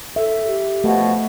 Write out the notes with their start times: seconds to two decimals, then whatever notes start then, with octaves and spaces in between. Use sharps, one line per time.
0.16 A4 E5
0.48 G4
0.84 B2 F3 A3 F#4